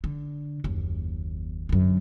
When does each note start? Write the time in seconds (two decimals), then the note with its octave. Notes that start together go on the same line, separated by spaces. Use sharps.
0.04 D3
0.64 F#1 D#2
1.69 F#2 D3